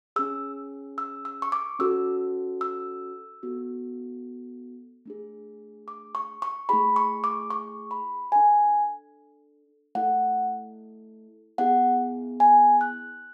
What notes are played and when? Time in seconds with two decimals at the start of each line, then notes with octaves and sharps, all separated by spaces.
0.16 C#4 G#4 E6
0.98 E6
1.25 E6
1.42 C#6
1.52 D6
1.79 C#4 F#4 A4 E6
2.61 E6
3.43 B3 F#4 A4
5.06 A3 D4 G#4
5.88 D6
6.15 C#6
6.42 C#6
6.69 A3 E4 G#4 B5
6.96 C#6
7.24 D6
7.50 C#6
7.91 B5
8.32 D4 A4 G#5
9.95 A3 E4 A4 F#5
11.58 B3 E4 G#4 F#5
12.40 G#5
12.81 F#6